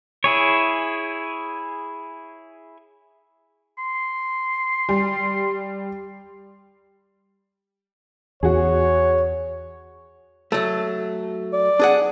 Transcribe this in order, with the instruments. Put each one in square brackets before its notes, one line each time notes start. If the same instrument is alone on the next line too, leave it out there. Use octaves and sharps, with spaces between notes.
[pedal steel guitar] E4 G#4 C#5
[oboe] C6
[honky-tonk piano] G3
[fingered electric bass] E2 [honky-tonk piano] F#4 G#4 [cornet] C#5
[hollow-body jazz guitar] F#3 A3
[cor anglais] D5
[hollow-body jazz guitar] D4 G#4 F#5